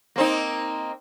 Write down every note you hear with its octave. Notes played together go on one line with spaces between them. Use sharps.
A#3 C4 D#4